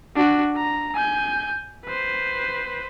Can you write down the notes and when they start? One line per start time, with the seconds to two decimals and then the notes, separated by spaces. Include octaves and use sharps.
0.16 D4 F#4
0.56 A#5
0.95 G#5 G6
1.85 B4 C5